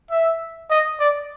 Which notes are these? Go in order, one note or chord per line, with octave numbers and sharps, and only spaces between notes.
E5
D#5
D5